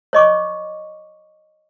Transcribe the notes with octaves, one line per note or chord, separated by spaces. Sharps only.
C#5 D#5 C#6 D6